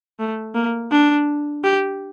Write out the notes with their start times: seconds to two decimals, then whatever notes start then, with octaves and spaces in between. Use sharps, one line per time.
0.20 A3
0.55 A#3
0.92 D4
1.64 G4